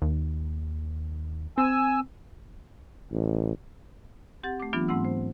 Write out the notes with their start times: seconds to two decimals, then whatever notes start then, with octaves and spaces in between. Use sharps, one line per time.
0.02 D#2
1.58 C4 G#5 E6
3.12 A1
4.43 C4 G4 F#5 A6
4.60 A3 D6
4.73 E3 F#3 B3 D4 F4
4.88 G#2 A3 C4 F#5 E6
5.05 C5